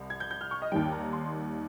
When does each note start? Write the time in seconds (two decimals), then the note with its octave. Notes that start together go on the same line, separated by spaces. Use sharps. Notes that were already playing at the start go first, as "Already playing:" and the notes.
Already playing: C2
0.10 G#6
0.20 G6
0.31 G6
0.41 F6
0.51 C#6
0.62 D#5
0.72 D#2 D#3 G3 G5
0.92 A#5
1.13 C6